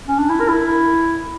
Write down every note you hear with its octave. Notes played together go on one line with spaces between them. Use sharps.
C#4
D4
E4
A#4
E4